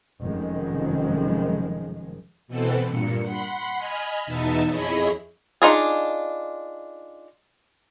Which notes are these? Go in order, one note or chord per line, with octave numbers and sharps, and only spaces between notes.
F1 F#2 D#3 F3 G#3
B2 E3 B3 C4 A4
G2 A#2 C#7
F#5 B5 C6
D#5 G#5 B5 F6
E2 B2 B3 D#4 E5 A5
F2 E4 G#4 C#5 D#5 B5
D4 D#4 F4 G#4